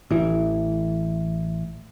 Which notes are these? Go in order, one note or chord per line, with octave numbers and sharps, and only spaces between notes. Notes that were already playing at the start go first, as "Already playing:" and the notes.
A1 E3